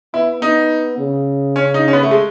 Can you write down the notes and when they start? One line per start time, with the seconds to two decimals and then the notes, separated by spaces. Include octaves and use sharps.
0.14 B3 E4
0.42 B3 D#4
0.98 C#3
1.56 C#4
1.74 D#4
1.88 C#4
1.93 B3
2.03 A3
2.11 G#3